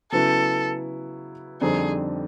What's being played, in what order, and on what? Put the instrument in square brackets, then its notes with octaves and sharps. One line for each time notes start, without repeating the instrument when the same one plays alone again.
[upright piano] C#3 F#3 B3 E4 [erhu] A4
[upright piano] F2 D3 G3 C4 D#4 [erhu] G#4